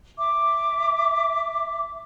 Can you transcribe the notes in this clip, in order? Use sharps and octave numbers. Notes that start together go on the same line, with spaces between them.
E5 D6